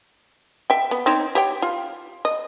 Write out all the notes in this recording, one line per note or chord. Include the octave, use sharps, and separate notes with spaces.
E5 G5
B3
C4 D#4 C#5
G4 C#5 G5
F4
D#5